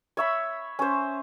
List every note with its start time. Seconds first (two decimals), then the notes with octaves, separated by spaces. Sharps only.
0.17 C#5 E5 B5
0.79 C#4 C5